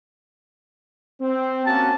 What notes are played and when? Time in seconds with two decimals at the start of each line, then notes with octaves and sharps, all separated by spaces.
1.20 C4
1.66 A#3 C#4 F#4 A5